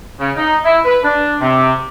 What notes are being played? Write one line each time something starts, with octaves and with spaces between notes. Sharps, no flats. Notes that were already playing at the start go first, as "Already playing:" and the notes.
C#3
D#4
E4
B4
D4
C3